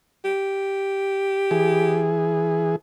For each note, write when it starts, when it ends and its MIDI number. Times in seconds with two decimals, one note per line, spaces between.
0.25 2.09 67
1.51 2.76 52
1.51 2.76 68